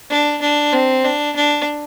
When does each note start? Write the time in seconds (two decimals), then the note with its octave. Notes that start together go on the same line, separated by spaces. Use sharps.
0.10 D4
0.42 D4
0.73 C4
1.04 D4
1.36 D4